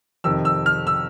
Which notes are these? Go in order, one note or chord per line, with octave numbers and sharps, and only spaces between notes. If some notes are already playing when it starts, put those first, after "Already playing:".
F2 C3 D#3 E6
E6
F6
E6